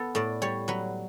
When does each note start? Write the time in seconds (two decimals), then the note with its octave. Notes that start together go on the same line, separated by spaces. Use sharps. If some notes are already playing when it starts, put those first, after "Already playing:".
Already playing: B3 A4
0.15 A2 D5
0.42 G3 C#5
0.68 F#3 B4